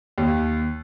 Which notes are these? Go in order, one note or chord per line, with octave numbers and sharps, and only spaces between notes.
D#2